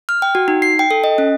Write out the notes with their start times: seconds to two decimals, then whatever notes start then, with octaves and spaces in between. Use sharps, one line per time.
0.09 F6
0.22 G5
0.35 F#4
0.48 D#4
0.62 C7
0.79 G5
0.91 A4
1.04 D#5
1.18 C#4